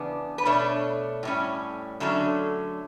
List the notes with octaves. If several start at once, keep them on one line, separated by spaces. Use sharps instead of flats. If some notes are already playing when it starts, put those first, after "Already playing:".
Already playing: C#3 E3 B3 D4
B4
B2 A3 D4 C#5
A2 G3 C#4
D3 F#3 A3 C#4